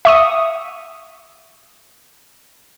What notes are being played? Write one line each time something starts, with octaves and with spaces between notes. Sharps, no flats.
E5 C#6 D#6